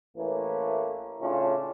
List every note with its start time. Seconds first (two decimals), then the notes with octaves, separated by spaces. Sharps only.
0.17 A1 E3 A3 A#3 C#4
1.21 A2 C#3 C#4 D4 F4